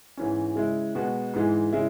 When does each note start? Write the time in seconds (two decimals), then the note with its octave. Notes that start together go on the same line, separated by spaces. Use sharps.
0.17 G#2 E3 C#4
0.55 C#3 G#3 E4
0.95 B2 G#3 B3 F#4
1.34 G#2 E3 G#3
1.73 C#3 G#3 E4